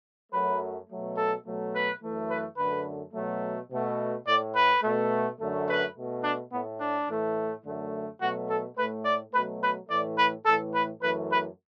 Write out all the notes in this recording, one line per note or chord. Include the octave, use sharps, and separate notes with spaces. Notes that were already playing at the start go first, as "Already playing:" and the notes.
F#2 F#3 A3 B4
B2 F#3 A3
A4
B2 F#3 A3
B4
F#2 E3 A3
B4
F#2 D3 A3 B4
B2 F#3 A3
B2 A3
A2 A3 D5
B4
B2 A3
F#2 D3 A3
B4
B2 A3
D4
A2 A3 B3
D4
A2 E3 A3
F#2 D3 A3
B2 F#3 A3 F#4
A4
A2 A3 B4
D5
B2 F#3 A3 B4
B4
A2 E3 A3 D5
B4
A2 E3 A3 A4
B4
F#2 E3 A3 B4
B4